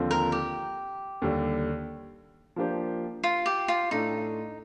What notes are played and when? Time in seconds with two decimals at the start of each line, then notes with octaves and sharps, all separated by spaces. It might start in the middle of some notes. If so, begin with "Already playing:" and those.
Already playing: D#2 D3 F3 C4
0.11 A#4
0.32 G4
1.22 D#2 D3 G3
2.56 F3 A#3 D4 G4 C5
3.24 F4
3.46 G4
3.68 F4
3.91 A2 A3 D4 D#4